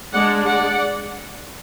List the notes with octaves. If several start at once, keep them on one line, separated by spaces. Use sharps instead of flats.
G#3 D4 D5 F#5
D5 F#5